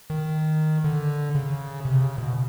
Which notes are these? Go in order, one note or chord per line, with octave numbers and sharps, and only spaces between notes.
D#3
D3
C#3
C3
C#3
B2